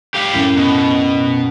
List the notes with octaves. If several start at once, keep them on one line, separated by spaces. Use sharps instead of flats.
G4 F5
F#2 A2
B2